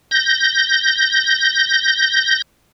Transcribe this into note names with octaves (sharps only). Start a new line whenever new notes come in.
G6 A#6